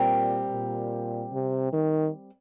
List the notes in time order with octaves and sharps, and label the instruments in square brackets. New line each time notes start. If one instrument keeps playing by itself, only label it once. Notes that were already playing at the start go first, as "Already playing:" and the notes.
Already playing: [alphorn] A#2 [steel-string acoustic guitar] G3 C4 G4 A#4
[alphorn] A#2
C3
D#3